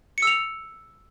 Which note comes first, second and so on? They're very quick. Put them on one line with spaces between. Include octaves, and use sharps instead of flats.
C#7 E6 F7